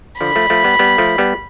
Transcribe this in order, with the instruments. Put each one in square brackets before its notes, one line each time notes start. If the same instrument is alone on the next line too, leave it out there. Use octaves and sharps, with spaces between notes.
[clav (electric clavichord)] D3 F3 [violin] B5
[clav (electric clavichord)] F3 A3
F3 A3
G3 B3
G3 B3
F3 A3
G3 B3